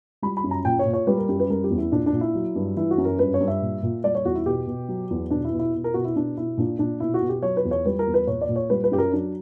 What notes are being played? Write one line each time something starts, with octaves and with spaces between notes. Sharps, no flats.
G3 B5
B5
F#2
A#5
A#2 G5
C#5
A#2
C#5
G3 B4
A#4
F#2 G4
B4
G3 A#4
G4
E2
E4
A#2 D4
D4
A#2
E4
F#3
G2
E3 E4
F#4
F#2
A#4
G2 B4
C#5
G2
E5
A#2
A#2
G3 D5
C#5
E2 F#4
E4
B2 G4
B2
F#3
E2
B2 D4
E4
B2
E4
B2
A#4
B2 F#4
E4
B2 D4
B2 E4
A#2 D4
A#2 D4
B2 E4
F#4
B2
G4
F#3 C#5
B4
E2
C#5
G3 B4
A#4
E2
B4
A#2 C#5
D5
A#2
C#5
G3 B4
B4
F#2 G4
A#4
F#3 D4